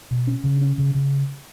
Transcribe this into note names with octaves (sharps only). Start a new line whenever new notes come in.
B2
C#4
C#3
C#4
C#3
C#3